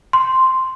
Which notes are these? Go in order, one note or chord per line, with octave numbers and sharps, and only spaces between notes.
C6